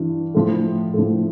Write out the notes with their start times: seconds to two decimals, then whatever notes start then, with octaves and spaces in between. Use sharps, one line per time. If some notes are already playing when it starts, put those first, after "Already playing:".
Already playing: G2 E3
0.35 A2 F3
0.94 A2 F3